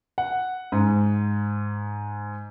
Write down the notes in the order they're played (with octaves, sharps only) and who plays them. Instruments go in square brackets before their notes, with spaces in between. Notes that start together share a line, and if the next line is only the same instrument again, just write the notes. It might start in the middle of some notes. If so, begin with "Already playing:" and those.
[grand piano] F#5
G#2